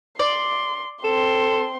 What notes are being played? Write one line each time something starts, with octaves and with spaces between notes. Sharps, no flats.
D5 C6
C4 A4 C6